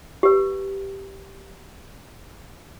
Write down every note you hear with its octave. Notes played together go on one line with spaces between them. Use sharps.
G4 B4